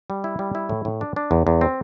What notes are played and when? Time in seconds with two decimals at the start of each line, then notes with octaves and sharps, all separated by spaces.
0.10 G3
0.24 E4
0.39 G3
0.55 E4
0.69 A2
0.85 A2
1.01 D4
1.16 D4
1.31 E2
1.47 E2
1.61 C4